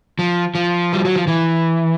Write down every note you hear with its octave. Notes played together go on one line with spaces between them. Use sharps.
F3
F3
G3
F#3
F3
E3